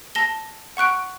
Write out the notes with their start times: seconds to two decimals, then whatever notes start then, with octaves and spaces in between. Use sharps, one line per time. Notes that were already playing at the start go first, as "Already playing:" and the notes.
0.15 A5 A#6 G7
0.77 F#5 C#6 F#6 D7